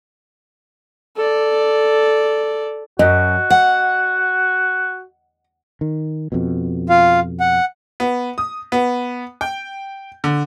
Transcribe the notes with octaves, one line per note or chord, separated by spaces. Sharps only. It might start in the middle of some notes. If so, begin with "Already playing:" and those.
A4 D5
F#2 F#4 D#5
F#5
D#3
F2 B2
F4 F5
F#5
B3
D#6
B3
G5
D3